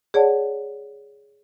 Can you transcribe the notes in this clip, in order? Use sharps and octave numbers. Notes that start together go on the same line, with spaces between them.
G#4 C#5 D5 F#5 A5